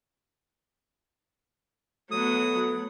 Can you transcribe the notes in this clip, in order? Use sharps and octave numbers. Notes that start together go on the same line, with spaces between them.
F#3 A3 B3 D#6